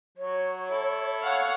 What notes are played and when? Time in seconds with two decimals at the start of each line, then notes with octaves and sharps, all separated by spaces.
0.17 F#3 C#5
0.70 E4 A4
1.23 C#5 F5 F#5